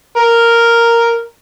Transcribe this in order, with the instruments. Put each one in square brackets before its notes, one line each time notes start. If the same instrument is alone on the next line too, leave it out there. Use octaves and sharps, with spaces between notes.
[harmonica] A#4